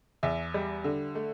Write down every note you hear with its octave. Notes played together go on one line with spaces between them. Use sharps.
E2 E5
G3
D3
A3